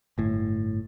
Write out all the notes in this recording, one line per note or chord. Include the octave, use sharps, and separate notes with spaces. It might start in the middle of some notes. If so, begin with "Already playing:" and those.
G1 A2